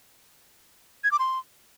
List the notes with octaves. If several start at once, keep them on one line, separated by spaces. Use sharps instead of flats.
G#6
D6
C6